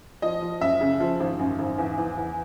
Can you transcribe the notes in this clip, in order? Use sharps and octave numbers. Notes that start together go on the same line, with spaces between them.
F3 D#5
F3
F#2 E5
C#3
F3
G#1
F#2
G#1
E2
E2
E2